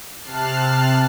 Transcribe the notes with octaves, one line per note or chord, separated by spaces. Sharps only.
C3 A5 F6 F#6 C7